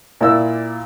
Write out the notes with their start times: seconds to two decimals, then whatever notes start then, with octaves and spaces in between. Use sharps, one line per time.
0.21 A#2 E4 D5 E6